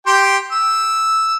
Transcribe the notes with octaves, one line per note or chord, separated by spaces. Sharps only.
G4 G5 C6
E6